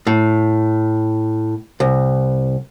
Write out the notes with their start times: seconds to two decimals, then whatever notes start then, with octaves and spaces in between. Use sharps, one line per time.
0.07 A2
1.80 C2